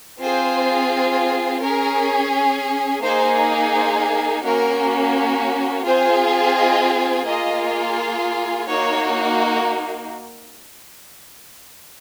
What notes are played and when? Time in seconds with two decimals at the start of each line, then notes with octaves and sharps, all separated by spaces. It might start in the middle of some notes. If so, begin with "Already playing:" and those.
0.20 C4 F4 G#4 C5
1.62 C#4 G#4 A#4
3.02 A#3 D#4 G#4 C5
3.74 C5
4.44 A#3 C#4 F#4 A#4
5.86 C4 F4 G#4 C5
6.56 D#5
7.27 A#3 F4 G#4 D#5
8.68 A#3 D#4 F#4 C#5